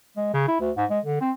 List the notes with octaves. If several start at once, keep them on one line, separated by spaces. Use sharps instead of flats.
G#3
C#3
E4
D2
G#2
G#3
D3
C4